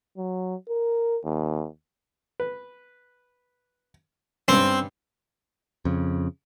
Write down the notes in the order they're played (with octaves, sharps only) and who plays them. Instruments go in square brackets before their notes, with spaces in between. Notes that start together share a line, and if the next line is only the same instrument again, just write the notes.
[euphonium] F#3
A#4
D#2
[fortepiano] B4
[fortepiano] G2 C#4 [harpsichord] C4
[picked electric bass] F2 C#3